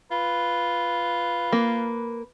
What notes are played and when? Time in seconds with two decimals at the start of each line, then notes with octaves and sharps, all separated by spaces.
0.11 F4 B4
1.53 A#3